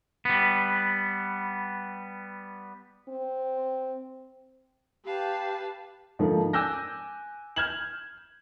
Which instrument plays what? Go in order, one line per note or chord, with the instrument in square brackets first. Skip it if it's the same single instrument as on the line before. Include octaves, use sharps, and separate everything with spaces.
[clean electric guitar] G3 B3
[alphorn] C4
[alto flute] G4 [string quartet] B4 F5 A5
[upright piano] G#2 D3 F3 A3 A#3
G#5 D6 E6 F#6 G6 A#6
F6 G6 G#6 E7 F#7